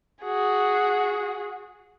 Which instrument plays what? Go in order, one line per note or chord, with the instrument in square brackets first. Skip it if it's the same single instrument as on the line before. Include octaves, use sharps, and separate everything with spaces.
[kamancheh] F#4 G#4